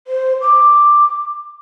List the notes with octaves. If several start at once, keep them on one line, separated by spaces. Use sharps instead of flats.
C5
D6